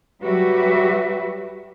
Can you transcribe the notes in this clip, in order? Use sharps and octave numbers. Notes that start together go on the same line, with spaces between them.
F#3 G3 F#4 G4 B4 E5